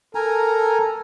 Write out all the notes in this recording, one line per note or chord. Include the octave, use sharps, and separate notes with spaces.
A4 A#4 G#5 A#5